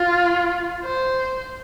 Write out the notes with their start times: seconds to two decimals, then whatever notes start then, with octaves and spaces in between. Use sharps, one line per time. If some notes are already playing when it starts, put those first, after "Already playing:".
Already playing: F4
0.84 C5